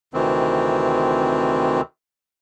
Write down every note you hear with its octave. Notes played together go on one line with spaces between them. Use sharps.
D2 C3 D#3 E3 C4